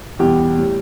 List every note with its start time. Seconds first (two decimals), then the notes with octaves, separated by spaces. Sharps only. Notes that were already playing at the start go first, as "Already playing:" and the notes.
0.19 E2 B2 G3 G4
0.57 A2 G3